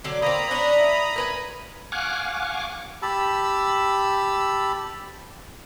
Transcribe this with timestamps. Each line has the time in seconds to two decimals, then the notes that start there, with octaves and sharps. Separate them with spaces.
0.04 D3 F#3 D6
0.22 A#3 C4 A#5 B5 D#6
0.51 C#4 D4
0.78 E4
1.16 A#4 B4 G#5
1.92 F5 F#5 G#5 C#6 D6
3.03 G4 A5 B5 E6